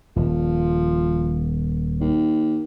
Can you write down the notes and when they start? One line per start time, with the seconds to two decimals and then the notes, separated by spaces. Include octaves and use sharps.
0.16 D#1 F3
2.00 D#2